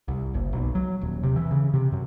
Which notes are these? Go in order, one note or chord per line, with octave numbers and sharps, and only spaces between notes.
C2
F#1
B1
F#3
D#1
C3
E3
C#3
C3
F#2